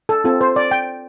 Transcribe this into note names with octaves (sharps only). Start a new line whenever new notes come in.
A4
C4 F4 A4
C5
D5
G5